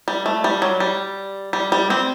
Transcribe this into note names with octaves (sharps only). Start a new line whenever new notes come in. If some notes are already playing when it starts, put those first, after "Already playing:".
G3
A3
G3
F#3
G3
G3
G3
C4